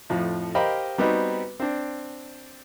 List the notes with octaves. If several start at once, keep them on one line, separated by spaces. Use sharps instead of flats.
F2 A2 F3
G4 A#4 C5 D#5 F5 B5
G3 B3 C4 D#4 F#4
C4 D4